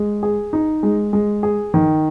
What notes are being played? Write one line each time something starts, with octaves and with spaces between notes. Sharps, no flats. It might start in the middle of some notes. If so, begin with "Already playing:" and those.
Already playing: G#3
G#4
D#4
G#3
G#3
G#4
D#3